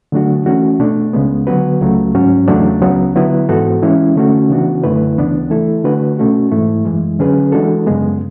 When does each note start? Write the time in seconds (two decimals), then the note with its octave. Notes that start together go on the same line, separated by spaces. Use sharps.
0.12 D3 F#3 A3 D4 F#4
0.46 E3 A3 C#4 F#4
0.79 B2 A3 D4
1.13 C#2 C#3 G#3 B3
1.47 D3 F#3 B3 F#4 B4
1.81 C#2 C#3 F#3 A3
2.14 G#2 F#3 C#4
2.48 E2 C#3 F#3 A3 D4
2.81 C#2 C#3 F#3 B3
3.15 D3 F#3 B3 E4 B4
3.49 G#2 E3 B3 F#4 A4
3.82 E3 G#3 C#4 E4
4.16 D3 A3 C#4 F#4
4.50 C#3 E3 B3 D4 F#4
4.83 F#2 D3 A3 E4 B4
5.17 D2 C#3 E3 B3 D4
5.50 E3 A3 E4 A4
5.84 D3 A3 D4 F#4 B4
6.19 B2 A3 C#4 F#4
6.51 G#2 E3 A3 E4
6.85 F#2 E3 G#3
7.19 D3 F#3 C#4 G#4 B4
7.52 E3 G#3 D4 F#4 A4
7.86 F#2 C#3 G#3 B3